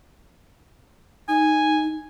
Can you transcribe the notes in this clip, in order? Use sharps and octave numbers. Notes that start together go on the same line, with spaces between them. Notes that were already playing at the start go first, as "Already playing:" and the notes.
D#4 G#5